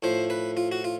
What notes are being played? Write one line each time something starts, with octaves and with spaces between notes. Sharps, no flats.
A2 F3 C5
B4
F4
F#4
F4